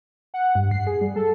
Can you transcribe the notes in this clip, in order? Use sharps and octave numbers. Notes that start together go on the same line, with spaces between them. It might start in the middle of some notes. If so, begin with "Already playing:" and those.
F#5
G2
C7
G#4
G3
A4